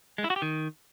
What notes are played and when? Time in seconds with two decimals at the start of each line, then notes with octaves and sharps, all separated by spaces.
0.18 G#3
0.24 E4
0.30 F#4
0.36 G4
0.42 D#3